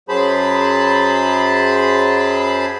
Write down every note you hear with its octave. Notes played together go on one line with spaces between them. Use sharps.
F#2 F#3 G#4 C5 A5 B5